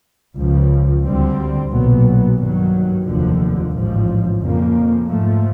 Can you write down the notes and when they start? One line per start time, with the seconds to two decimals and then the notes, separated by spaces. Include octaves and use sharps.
0.37 C#2 C#3 F3
1.04 D2 D3 G3 C4
1.70 B1 A#2 F#3 B3
2.37 G2 D#3 F#3
3.05 F1 D#2 D3 F3
3.72 A1 G#2 F3
4.39 F2 C#3 F3 A#3
5.06 G#2 F3 A3